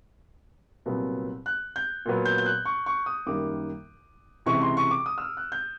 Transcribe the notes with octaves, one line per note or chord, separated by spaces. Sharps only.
C2 A#2 F#3 B3
F#6
G6
A#2 F#3 B3
G6
G6
F#6
C#6
C#6
D#6
F#2 D#3 G3 A#3 D6
C#2 C3 E3 C#6
C6
C#6
D6
D#6
E6
F6
F#6
G6